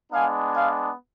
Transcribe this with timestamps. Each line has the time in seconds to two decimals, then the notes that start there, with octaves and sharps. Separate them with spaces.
0.13 G#3 B3 D4 F5 G#5
0.54 F5 G#5